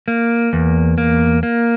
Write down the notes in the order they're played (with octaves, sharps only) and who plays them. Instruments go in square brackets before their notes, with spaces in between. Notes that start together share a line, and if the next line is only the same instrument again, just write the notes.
[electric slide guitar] A#3
E2
A#3
A#3